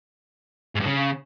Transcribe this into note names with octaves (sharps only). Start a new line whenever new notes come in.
G#2
G2
C#3